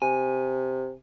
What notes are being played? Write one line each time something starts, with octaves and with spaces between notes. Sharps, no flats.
C3 G#5